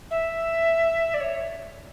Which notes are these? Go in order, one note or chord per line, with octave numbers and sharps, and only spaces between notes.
E5
D5
C#5